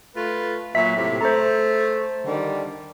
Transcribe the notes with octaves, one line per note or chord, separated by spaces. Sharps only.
A3 F4 B4
A#2 F#3 E5 B6
A2 C3
A3 C5 A#5
D3 D#3 G3